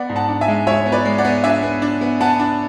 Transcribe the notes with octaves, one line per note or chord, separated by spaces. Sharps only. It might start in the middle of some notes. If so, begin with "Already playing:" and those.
Already playing: B3 D5 F#5
G#2
F#5 A5
D4
E5 G#5
G#3
G#3 C#5 E5
B3
B4 D5
G#3
D5 F#5
B3
D4 E5 G#5
B3
D4
B3
B3 F#5 A5
D4